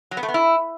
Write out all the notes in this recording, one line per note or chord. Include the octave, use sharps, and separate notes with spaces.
F#3
B3
A3
B3
E4